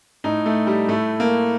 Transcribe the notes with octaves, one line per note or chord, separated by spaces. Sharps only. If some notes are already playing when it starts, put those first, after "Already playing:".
A2 D#4
A3
G3
A2 A3
A#3